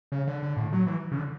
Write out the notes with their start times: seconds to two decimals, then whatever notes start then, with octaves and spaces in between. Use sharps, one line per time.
0.12 C#3
0.27 D3
0.42 D3
0.57 A2
0.73 F#3
0.87 E3
1.12 C#3
1.17 D3